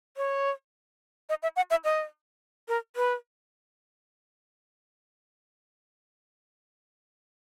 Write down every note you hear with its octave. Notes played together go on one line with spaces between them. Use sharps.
C#5
D#5
E5
F#5
E5
D#5
A#4
B4